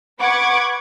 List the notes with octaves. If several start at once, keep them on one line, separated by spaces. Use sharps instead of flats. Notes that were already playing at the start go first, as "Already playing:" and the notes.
B4 F#5 C#6 D6 G#6